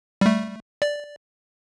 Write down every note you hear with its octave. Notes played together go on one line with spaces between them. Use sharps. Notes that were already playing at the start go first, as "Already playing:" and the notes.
G3 A3
D5